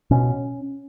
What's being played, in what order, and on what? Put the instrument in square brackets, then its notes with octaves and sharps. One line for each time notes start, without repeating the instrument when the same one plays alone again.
[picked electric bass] B2 C#4